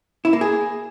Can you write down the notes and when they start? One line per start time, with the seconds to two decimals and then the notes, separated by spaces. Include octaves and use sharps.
0.25 E4
0.33 A#3
0.41 G#4